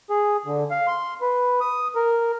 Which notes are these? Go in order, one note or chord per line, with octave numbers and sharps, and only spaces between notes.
G#4
D3
F5
C6
B4
D#6
A#4